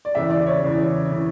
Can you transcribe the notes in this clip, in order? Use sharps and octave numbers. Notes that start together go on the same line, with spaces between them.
D5
E2 C#3 E3 E5
D5
C#5
E2 C#3 E3
C#3 E3